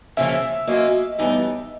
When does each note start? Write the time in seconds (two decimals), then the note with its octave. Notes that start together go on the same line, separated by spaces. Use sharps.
0.17 C#3 F3 A#3 C#4 E5
0.67 F#3 A#3 C#4 F4 D#5
1.18 A2 E3 G3 B3 D#4